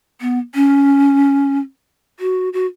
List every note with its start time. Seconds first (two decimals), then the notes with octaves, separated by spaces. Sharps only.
0.21 B3
0.55 C#4
2.20 F#4
2.53 F#4